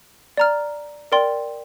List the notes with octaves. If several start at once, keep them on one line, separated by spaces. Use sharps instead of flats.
D5 A#5 F6
A#4 D5 G5 C6